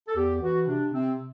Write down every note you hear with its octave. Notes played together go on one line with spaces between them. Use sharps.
A4
E2 G4
E3 F#4
C3 D4
C3 C4